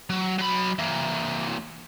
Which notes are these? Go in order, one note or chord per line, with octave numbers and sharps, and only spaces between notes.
F#3
F#3 B5
E3 A#3